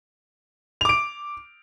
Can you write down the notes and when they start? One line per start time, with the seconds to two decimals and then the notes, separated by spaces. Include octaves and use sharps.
0.81 F7
0.85 D6
0.89 D7